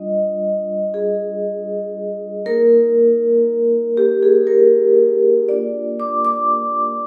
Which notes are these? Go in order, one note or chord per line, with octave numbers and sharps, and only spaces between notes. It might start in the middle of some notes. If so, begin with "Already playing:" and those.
Already playing: G3 D4 F4 D#5
G#4
A#3 D#4 A#4
G4
G#4
A#4
A#3 D4 F4 D5
D6
D6